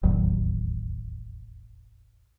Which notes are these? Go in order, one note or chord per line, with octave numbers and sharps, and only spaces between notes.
E1 A1 D#2 F#3